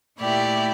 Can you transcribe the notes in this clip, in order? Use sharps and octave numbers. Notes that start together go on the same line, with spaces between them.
A#2 A3 E4 G4 D5